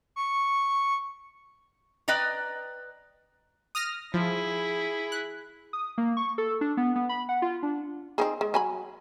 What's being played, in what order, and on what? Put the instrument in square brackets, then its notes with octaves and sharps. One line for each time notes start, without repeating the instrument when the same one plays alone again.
[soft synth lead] C#6
[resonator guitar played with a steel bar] B4 D5 D#5 G5 A#5
[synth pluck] D#6 F6 A#6
[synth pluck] F3 [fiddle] E4 G#4
[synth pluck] F#6
[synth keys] D#6
A#3
C#6
A4
D4
B3
B3
B5
F#5
F4
D4
[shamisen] C4 D#4 G#4
G#3
F#3 G#5 B5